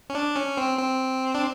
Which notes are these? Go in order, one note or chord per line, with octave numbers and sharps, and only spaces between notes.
C#4
D4
C#4
C4
C4
D4